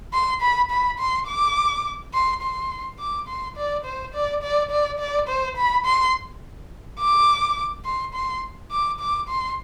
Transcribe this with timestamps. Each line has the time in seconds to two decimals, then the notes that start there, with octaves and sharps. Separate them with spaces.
0.13 C6
0.41 B5
0.71 B5
0.99 C6
1.27 D6
2.14 C6
2.42 C6
2.99 D6
3.28 C6
3.56 D5
3.85 C5
4.14 D5
4.43 D5
4.71 D5
4.99 D5
5.28 C5
5.57 B5
5.85 C6
7.00 D6
7.85 C6
8.14 C6
8.71 D6
9.00 D6
9.29 C6